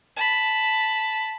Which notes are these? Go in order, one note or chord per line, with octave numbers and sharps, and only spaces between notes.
A5 B5